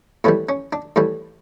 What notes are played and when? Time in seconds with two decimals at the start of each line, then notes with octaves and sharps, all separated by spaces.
0.24 A2 E3 G3 B3
0.49 C#4
0.73 D4
0.96 A2 E3 G3